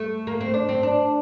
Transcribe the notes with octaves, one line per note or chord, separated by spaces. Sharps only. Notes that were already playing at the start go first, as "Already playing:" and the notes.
Already playing: A3
A#3
C4
D4
C4
D4